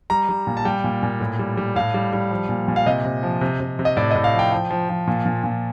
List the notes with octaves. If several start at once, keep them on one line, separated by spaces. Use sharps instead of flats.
G3 A#5
G3
A#2
A5
G3 G5
A#2
A#2
A2
G3
G3
A2 F5
G3
G3
F3
A#2
A#2
F5
C3 D#5
C3
F3
C3
C3
C3
D#5
A2 D5
A2 D#5
F5
F3
G5
F3 G5
F3
F3
A#2
A#2
A#2